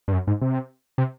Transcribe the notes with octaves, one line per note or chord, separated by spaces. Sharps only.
G2
F#2
G#2
C3
C3